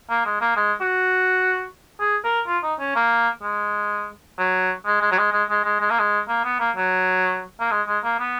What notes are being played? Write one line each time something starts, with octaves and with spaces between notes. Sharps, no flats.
A#3
G#3
A#3
G#3
F#4
G#4
A#4
F4
D#4
C#4
A#3
G#3
F#3
G#3
G#3
F#3
G#3
G#3
G#3
G#3
G#3
A#3
G#3
A#3
B3
A#3
F#3
A#3
G#3
G#3
A#3
B3